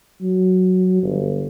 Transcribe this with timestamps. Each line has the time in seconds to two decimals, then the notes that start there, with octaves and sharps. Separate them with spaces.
0.21 F#3
1.03 G1